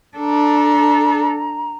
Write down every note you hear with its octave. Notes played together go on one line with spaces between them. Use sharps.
D4 A4 A#5